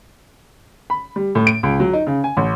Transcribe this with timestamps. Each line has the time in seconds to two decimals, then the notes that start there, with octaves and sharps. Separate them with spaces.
0.90 B5
1.16 G3
1.35 A2
1.47 D7
1.63 C#2
1.80 F#3
1.93 D#4
2.07 C#3
2.24 G#5
2.37 A1